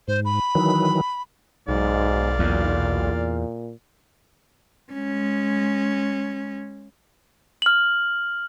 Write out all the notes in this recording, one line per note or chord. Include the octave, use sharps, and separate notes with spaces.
G#2 C5
B5
D#3 E3 F#3
B1 G#2 D5 F5
E2 A#2
G#3 C#4
F6 F#7